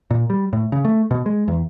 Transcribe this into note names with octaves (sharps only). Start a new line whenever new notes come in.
A#2
G3
A2
C#3
A3
B2
G#3
E2